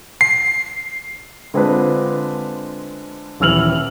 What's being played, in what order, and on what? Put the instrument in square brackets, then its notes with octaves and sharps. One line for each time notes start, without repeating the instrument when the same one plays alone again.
[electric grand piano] C7
[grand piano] D3 G#3 C4 D4 F4 B4
D#1 E3 E6 F6 F7 F#7